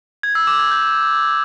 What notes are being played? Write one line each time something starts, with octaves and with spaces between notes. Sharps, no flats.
G#6
E6
D6
G#6
G6